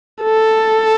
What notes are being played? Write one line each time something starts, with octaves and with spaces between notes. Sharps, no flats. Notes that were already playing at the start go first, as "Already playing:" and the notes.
A4